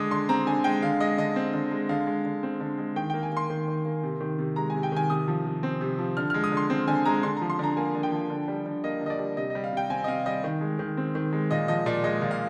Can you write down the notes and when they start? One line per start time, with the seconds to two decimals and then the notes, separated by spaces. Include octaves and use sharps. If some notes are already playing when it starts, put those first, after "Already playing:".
Already playing: D3 G#3 D6 D#6
0.11 D3 C6
0.29 C4 A#5
0.47 D3 G#5
0.64 G#3 G5
0.83 D3 F5
1.00 G#3 D#5
1.18 D3 D#5
1.36 C4
1.54 D3
1.71 G#3
1.89 D3 F5
2.07 G#3
2.25 D3
2.43 C4
2.60 D3
2.78 G#3
2.96 D#3 G5
3.10 A#3 G5
3.23 G#5
3.32 A#3 C6
3.50 D#3
3.68 D#3
3.85 A#3
4.03 C3
4.21 D#3
4.39 C3
4.56 G#3 A#5
4.70 C3 G#5
4.83 G5
4.92 D#3 G#5
5.10 C3 D#6
5.28 F3
5.45 C3
5.63 C4
5.81 C3
5.99 F3
6.17 D3 F6
6.30 G#3 F6
6.44 D#6
6.52 D3
6.57 C6
6.70 C4
6.88 D3 G#5
7.06 G#3 A#5
7.23 D3 C6
7.37 F3 A#5
7.50 C6
7.59 D3 A#5
7.77 A#3 G#5
7.95 D3
8.03 G5
8.12 F3
8.30 D3
8.48 G3
8.66 D3
8.84 A#3 D#5
9.01 D3 D#5
9.10 D5
9.19 G3
9.37 C3 D#5
9.50 G3 D#5
9.64 F5
9.73 C3 G5
9.90 C4 G#5
10.04 D#5
10.08 C3 F5
10.26 G3 D#5
10.44 D#3
10.61 G#3
10.79 D#3
10.97 C4
11.15 D#3
11.33 G#3
11.51 A#2 D#5
11.68 F3 D#5
11.86 A#2 D5
12.04 G#3 D#5
12.22 A#2
12.31 F5